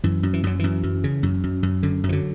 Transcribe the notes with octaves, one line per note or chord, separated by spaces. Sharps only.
F#2 E3
F#2
E3
F#2 F#3
F#2 E3
F#2
C#3
F#2
F#2
F#2
F#2 D3
F#2
E3
D3 F#3